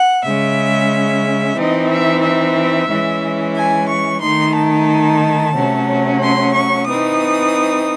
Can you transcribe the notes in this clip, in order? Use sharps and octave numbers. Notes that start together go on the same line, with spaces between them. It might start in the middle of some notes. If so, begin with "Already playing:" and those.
Already playing: F#5
C#3 G#3 C#4 E5
E3 C4 D#4 D#5
E5
E5
E3 G#3 C#4
G#5
C#6
D#3 A3 D#4 C6
A5
C3 F#3 A3 C#4
C6
C#6
E3 C4 D#4 D#6